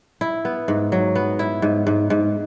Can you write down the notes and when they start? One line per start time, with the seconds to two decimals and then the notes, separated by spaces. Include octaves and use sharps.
0.21 E4
0.45 B3
0.68 G#2
0.92 F#3
1.15 B3
1.39 E4
1.62 G#2
1.87 G#2
2.10 G#2